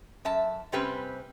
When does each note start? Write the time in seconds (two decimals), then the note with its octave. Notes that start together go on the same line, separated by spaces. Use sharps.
0.25 F#2 E5 A5
0.72 C3 G3 C4 C#4 G4 B4